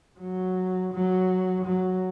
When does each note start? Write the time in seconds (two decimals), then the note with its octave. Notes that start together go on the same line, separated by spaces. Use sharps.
0.20 F#3
0.93 F#3
1.65 F#3